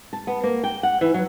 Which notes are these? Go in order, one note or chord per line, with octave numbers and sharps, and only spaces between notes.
A5
B3
A#3
G5
F#5
E3
F#3